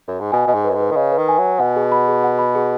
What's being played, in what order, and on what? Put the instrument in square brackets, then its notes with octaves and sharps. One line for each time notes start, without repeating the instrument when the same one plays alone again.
[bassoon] F#2
G#2
[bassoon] B2 [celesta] G#5
[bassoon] B2 [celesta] D#5
[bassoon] G#2
[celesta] B4
[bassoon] F#2
G#2
[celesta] B4
[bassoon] D#3
[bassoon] C#3 [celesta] D#5
[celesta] B4
[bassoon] D#3
[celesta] G#5
[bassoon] F#3
[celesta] G#5
[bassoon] B2 [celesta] F#5
[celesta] G#4
B5
G#4
F#5
B5
G#4